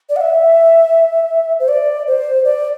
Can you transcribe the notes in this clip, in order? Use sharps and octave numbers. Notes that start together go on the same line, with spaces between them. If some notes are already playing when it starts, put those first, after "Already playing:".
D5
F#5
E5
C5
D5
C5
D5